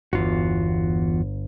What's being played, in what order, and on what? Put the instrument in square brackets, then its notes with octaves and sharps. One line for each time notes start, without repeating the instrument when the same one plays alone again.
[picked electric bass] G1 [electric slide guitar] E2 F4 F#4